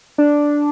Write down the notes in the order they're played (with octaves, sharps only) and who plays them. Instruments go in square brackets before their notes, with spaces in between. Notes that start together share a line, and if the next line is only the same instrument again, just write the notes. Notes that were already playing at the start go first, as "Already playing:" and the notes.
[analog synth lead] D4